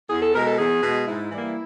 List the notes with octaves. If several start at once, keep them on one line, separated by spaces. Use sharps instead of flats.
E2 G#4
A4
B2 G#3 A#4
A4
E2 G#4
B2 G#3
G#2 E4
E3 G3 A#3